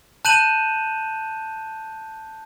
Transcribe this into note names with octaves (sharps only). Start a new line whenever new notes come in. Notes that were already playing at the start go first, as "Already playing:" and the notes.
A5 F#6 G6 D#7 E7 F#7